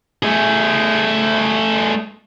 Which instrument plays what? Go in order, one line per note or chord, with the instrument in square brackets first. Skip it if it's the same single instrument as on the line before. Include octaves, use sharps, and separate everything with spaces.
[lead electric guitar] A3 G#4